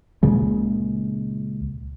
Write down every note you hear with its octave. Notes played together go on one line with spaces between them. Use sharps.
C#2 A#2 C#3 G#3